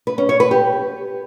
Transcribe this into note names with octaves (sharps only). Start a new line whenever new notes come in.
B4
C#4
C#5
B4
G4